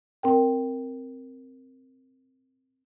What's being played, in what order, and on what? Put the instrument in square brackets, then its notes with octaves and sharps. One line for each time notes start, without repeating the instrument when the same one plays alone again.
[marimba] C4 A#4 G5